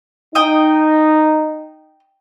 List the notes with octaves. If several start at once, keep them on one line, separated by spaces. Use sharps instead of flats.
D#4 G5 D#6